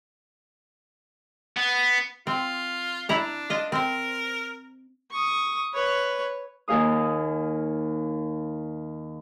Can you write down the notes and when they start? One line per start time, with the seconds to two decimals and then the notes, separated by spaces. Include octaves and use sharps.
1.57 B3
2.27 C4 F4
3.09 D4 E4 A#5
3.50 F4 D#5
3.72 C4 A#4 C5
5.11 C#6 D#6
5.74 B4 C#5
6.68 D#2 D#4 G#4 F5 D#6